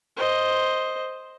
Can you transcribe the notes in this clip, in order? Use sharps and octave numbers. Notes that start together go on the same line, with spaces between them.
C5 D#5